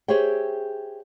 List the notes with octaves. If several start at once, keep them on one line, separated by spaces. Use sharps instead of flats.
G4 G#4 C5 C#5 E5 G5